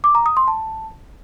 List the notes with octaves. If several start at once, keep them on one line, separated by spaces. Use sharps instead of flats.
D6
A#5
D#6
C6
A5